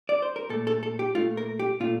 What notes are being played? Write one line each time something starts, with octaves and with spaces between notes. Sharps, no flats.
D5
C5
A#4
A#2 A3 A4
A4
A4
G4
A#2 A3 F4
A#4
G4
A#2 A3 F4